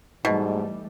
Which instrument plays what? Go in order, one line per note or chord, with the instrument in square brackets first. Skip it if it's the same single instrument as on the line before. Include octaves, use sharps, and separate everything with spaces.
[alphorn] G#2 [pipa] B2 [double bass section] E3 G3 A3 [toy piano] D#4 D#5